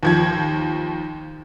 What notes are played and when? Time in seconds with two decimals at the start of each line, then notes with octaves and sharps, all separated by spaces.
0.03 D#2 F3 G#6